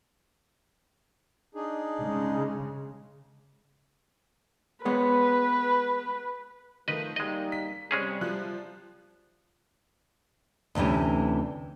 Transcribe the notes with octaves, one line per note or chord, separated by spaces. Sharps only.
D4 D#4 G#4
C#3 G#3
G#3 B3 B4 C#5
D#3 F3 A3 B4 D#5
G3 G#3 A#3 D#4 D#5
B6
C3 G3 G#3 C#4 G#4
F3 F#6
D2 C3 E3 A3 C#4